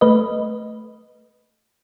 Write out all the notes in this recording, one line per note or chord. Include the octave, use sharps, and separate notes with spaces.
A3 B4 D#5